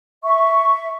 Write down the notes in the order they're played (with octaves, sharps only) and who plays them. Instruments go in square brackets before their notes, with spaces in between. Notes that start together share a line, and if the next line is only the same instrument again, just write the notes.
[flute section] E5 C#6